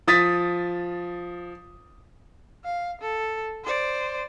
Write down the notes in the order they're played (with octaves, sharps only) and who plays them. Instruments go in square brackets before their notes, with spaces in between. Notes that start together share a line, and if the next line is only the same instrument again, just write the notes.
[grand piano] F3 D#6 A6 B6
[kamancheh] F5
A4
C5 D5